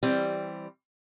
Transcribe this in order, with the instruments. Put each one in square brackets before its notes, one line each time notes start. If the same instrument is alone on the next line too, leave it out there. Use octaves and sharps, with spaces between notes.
[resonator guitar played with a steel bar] E3 G3 C4